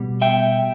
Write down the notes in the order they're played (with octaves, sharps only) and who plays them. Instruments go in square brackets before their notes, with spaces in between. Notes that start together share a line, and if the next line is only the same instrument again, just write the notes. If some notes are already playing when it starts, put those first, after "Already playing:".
Already playing: [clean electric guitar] B2 G3
E5 G5